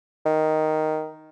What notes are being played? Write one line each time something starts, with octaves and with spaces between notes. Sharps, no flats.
D#3